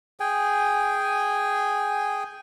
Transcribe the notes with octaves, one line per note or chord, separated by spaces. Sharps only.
G#4 G5 G#5